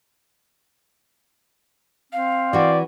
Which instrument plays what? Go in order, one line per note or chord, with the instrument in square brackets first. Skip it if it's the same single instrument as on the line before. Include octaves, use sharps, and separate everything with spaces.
[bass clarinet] C4 [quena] F5
[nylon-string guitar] E3 F#4 [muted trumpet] D5